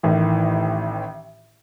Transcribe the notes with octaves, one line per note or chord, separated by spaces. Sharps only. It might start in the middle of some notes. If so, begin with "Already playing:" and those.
A1 A2 D#3 E3